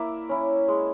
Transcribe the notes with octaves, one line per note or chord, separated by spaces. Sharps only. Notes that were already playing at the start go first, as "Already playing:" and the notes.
Already playing: A#3 E4 D5 E5
C#4 E4
G#3